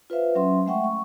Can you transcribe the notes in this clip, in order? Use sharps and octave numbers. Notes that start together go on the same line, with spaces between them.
F4 B4 C5 E5 F5
F#3 C#4 E5 C6
G#3 A3 E5 F#5 G5 C#6
C#6